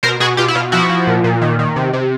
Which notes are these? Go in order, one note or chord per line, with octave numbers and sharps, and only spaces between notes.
B2 A#4 C5
B2 F#4 G#4
B2 F4 G4
E4
B2 F4
F3 E4 F#4
F3
A#2
A#2
D#3
D#3
C3
C3